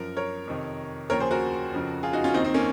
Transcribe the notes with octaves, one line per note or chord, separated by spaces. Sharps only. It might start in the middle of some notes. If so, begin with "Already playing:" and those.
Already playing: F#2 F3 A#4
A#4 C#5
F2 C3 D#3
D#2 C#3 F3 A#4 C#5
G#4 C5
F#4 A#4
F2 C#3 F3
F4 G#4
D#4 F#4
C#4 F4
D#2 D#3 C4 D#4
C4 D#4
A#3 C#4